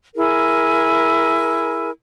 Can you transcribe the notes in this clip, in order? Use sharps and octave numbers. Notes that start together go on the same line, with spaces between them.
E4 G#4 A#4